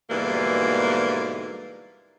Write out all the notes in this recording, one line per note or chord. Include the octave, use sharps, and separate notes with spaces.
G#2 B2 D3 E3 G3 A#3